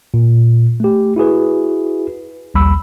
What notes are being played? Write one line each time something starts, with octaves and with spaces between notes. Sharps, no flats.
A#2
A3 G4
E4 F#4 G#4 B4
A#1 D#2 G3 B5 E6